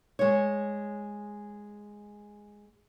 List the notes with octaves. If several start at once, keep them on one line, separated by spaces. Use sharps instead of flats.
G#3 C#5